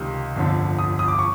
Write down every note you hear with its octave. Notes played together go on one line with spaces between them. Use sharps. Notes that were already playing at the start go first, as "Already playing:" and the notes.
Already playing: C#2 C3 D#3 G3
G1 F2 D3
D#6
D#6
D6
C#6